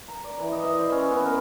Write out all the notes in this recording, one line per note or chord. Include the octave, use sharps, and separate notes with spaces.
A#5
D5
E3
D#5
E5
C5
C#4
B3
A#4